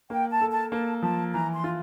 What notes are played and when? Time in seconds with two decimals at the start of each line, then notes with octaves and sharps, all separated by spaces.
0.10 A#3 G5
0.31 A5
0.41 A4
0.51 A5
0.72 A#3 A5
1.02 F3 A5
1.33 E3 A#5
1.54 C6
1.64 F4